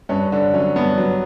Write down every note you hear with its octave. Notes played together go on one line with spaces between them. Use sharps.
G2 C#4
D3
F#3 C#4
G2 B3
F#3